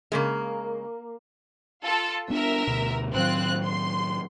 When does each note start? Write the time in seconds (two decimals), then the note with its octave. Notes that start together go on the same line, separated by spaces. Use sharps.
0.12 C#3 G#3 A#3 A#4
1.84 F4 A4
2.30 B3 D4 A#4 E5
2.67 D2 B2
3.14 A2 D#3 F#3 C4 F4 F#6
3.64 C6